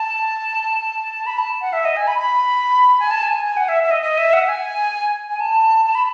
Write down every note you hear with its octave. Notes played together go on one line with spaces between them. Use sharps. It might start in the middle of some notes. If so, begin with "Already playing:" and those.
Already playing: A5
B5
A5
F#5
E5
D#5
G#5
B5
B5
G#5
A5
G#5
G#5
G#5
F#5
E5
E5
D#5
D#5
E5
F#5
G#5
G#5
A5
A5
B5